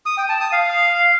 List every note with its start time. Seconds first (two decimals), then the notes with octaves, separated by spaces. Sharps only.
0.06 D#6
0.17 G5
0.29 A5
0.41 D#6
0.52 F5